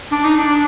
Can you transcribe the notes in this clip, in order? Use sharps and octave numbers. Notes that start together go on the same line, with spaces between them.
D4
D#4
D4